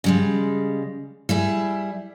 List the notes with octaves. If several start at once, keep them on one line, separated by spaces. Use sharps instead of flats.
C#3 G3 G#3
G3 E4 G#4